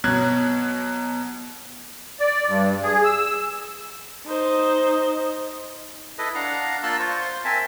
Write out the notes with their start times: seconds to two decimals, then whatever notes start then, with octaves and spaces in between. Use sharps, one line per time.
0.04 B2 F#3 F#6 G#6
2.20 D5
2.47 G2
2.83 G#4
3.04 E6
4.27 D#4 C5
6.18 E4 A4 B4 D#5
6.35 D4 F5 F#5 A#5
6.83 A#3 F4 A5 C6 E6 F#6
6.99 F4 C5 C#6
7.21 C5 C6
7.45 C4 A#4 E5 G#5 A5